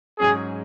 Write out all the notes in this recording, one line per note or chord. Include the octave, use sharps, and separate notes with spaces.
G#2 F#3 C#4 G#4